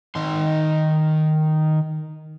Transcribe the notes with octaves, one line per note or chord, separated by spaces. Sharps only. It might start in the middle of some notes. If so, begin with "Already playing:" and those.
D#3 C6